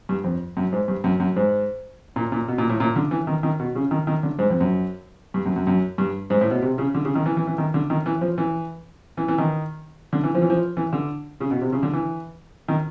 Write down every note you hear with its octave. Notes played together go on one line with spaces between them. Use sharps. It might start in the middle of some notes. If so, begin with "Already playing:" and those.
G2
F2
F#2
G#2
G2
F#2
F#2
G#2
A#2
A#2
B2
A#2
A2
A#2
D3
E3
D#3
D#3
B2
C#3
D#3
D#3
D3
G#2
F2
F#2
G2
F#2
F#2
F#2
G2
G#2
A2
B2
C3
C#3
D3
C#3
D#3
E3
E3
E3
D#3
D3
D#3
E3
F3
E3
E3
E3
D#3
D3
E3
F3
E3
F3
E3
D3
C#3
B2
C3
C#3
D3
E3
D#3